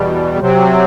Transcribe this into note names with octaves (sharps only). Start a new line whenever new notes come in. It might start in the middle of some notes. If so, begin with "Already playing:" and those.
Already playing: E2 B2 G3
C3 F#3 C4